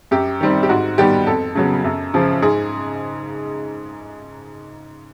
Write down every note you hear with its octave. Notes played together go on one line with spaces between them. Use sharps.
F#2 G4
D#3 G3 C4
G4
G#2 F#4
D#3 G3 B3 G4
F2 A4
C#3 F#3 B3
F#2
C#3 F3
G#2 G#4